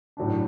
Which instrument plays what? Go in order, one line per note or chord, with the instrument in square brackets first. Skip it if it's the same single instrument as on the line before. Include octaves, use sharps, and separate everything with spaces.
[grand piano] A2 F#3 A3 D4